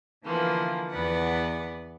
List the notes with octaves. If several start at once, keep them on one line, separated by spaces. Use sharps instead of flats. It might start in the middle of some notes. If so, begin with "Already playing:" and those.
D3 E3 F3 A#3 B3
E2 B3 B4 D5 F#5 A6